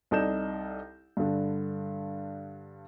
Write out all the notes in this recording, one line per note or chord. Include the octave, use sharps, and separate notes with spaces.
C2 D#4 A4 D5 G6 E7
G2 D3